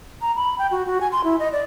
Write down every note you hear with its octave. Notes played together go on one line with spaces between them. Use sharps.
A#5
B5
G5
F#4
F#4
G#5
C6
E4
D#5
D5